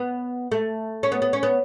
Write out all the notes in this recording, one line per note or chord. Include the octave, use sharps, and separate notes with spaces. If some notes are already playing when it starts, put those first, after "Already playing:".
Already playing: B3
A3
C#4
B3
B3
C#4
B3